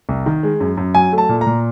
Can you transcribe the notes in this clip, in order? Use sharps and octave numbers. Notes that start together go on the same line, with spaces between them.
C2
D#3
G#3
F#2
F#2
F#3 G#5
A3
A5
A#2
A#5
A#2